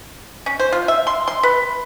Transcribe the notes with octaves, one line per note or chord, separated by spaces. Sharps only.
C#4
C5
F4
E5
C6
C6
B4